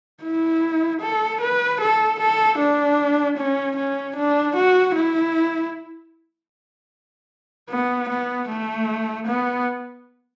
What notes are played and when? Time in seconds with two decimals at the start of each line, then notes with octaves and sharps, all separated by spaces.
0.23 E4
1.02 A4
1.41 B4
1.81 A4
2.20 A4
2.58 D4
3.37 C#4
3.77 C#4
4.16 D4
4.56 F#4
4.95 E4
7.70 B3
8.09 B3
8.49 A3
9.27 B3